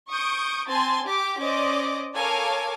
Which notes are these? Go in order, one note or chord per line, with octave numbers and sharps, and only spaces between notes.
C#6 D#6 G6 D7
C4 G#5 A5 C6 A6
G4 D6
C#4 C5 D5 D#5 D6
A4 A#4 C#5 F5 G#5 D6